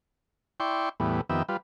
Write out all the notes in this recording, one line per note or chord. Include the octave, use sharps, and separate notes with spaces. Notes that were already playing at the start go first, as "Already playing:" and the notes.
E4 D5 G5 C6 C#6
E2 A2 G3 B3
F2 D#3 B3 G4 E5
G3 F4 B4